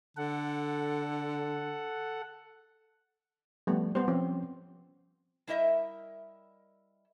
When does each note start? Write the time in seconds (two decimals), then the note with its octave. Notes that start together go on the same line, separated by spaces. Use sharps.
0.17 D3 A4 F#5
3.67 F3 G3 A3 B3
3.95 G3 B3 C5
4.08 F3 C4 C#4
5.47 G3 E4 A#4 D#5 E5